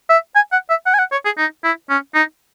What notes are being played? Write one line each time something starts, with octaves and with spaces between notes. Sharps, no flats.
E5
G#5
F#5
E5
F#5
G#5
F#5
C#5
G#4
D#4
E4
C#4
D#4